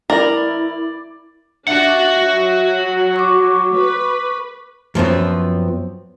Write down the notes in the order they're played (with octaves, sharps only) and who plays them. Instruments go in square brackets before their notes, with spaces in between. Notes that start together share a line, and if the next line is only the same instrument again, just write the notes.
[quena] E4 [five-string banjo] A#4 [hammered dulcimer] D5
[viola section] D4 [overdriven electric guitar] F#4 F#5 [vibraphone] E5
[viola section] F#3
[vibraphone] C#6 D6
[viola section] B4
[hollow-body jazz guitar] F#2 F3 B3 C4